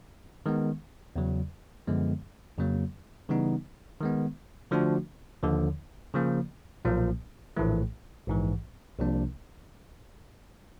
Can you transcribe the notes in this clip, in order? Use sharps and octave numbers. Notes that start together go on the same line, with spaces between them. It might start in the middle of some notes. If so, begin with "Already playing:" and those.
D#3 G#3 B3
E2 C#3 F#3
F#2 D3 F3 G#3 B3
F2 C#3 F#3 A#3
C#3 E3 G3 B3 D#4
D#3 G#3 B3
D3 F3 A3 D4 F#4
D#2 D3 F3
C#3 F3 A#3
B1 A#2 F3 A#3
A#1 A2 E3 A3
A#1 G#2 E3
C2 C3 F3 A#3 D4